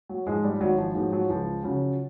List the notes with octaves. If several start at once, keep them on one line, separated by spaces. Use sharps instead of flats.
F#3
G#2 F3 G#3
G3
G#1 F#3
F3
G#2 F3 F#3
F#3
C#2 F3
C#3 F3 F#3